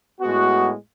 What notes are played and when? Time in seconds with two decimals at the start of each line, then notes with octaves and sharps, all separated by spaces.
0.20 A2 G#3 B3 F#4